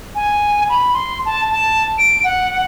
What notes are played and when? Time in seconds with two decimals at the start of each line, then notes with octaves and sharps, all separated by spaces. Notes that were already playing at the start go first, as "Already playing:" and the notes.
0.15 G#5
0.69 B5
0.94 C6
1.26 A5
1.50 A5
1.98 D7
2.24 F#5